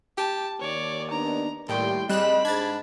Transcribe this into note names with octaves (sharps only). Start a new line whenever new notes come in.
G4 A5
D#2 C#5 D5
B3 D4 D#4 A#5
D#2 A2 G3 G5 C6
G3 C4 G#4 D#5 B5 F#6 E7
G#2 D4 G#6 A6